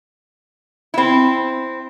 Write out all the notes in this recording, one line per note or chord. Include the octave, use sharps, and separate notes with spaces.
C4 E4